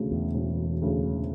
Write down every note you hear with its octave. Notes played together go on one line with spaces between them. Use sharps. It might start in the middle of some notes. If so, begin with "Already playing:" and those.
Already playing: E1 D2 C#3
E2
E1
D2 C#3